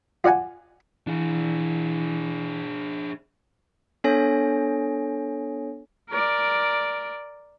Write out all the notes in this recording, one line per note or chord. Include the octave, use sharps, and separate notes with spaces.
F4 D5 F#5 G#5 A5
E3 D4 G#4
B3 D4 A4 C#5 G#5 A#6
A#4 D5